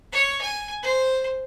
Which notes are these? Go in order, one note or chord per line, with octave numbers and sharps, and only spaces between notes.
C#5
G#5
C5